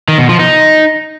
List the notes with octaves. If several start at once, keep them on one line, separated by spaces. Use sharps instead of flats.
D#3
B2
F3
D#4